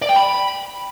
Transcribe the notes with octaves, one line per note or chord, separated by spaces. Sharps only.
D5
G5
B5